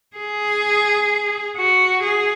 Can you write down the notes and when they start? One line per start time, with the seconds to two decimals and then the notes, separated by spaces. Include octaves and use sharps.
0.16 G#4
1.57 F#4
2.03 G#4